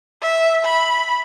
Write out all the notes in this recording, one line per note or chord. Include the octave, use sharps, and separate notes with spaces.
E5
B5